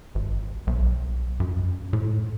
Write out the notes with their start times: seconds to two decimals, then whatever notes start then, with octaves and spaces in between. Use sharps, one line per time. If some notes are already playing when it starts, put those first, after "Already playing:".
0.15 G#1
0.67 B1
1.40 F#2
1.93 A2